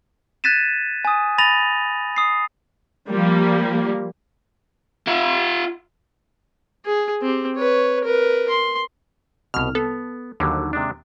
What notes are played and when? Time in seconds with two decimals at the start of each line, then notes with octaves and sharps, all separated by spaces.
0.44 F#6 G#6 A6 B6 D#7 E7
1.05 G#5 D#6
1.38 B5 A6 A#6 D#7 F7 F#7
2.16 D#6 C7
3.09 F3 G3 A#3
5.08 F4 E5
6.85 G#4
7.22 C4 G4
7.56 B4 C#5
8.04 A#4 B4
8.49 C6
9.54 C2 B2 F6
9.75 B3 A4
10.40 D#2 D3 F#3 G3
10.73 C3 G#3 D4